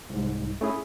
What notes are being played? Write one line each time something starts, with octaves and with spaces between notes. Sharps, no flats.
C2 G#2
A3 C#4 E4 G#4